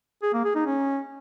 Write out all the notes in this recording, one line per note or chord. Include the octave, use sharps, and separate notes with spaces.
G#4
A#3
G#4
D#4
C#4